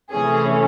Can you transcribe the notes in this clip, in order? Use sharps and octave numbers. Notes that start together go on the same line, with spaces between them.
C3 E3 A3 C#4 G#4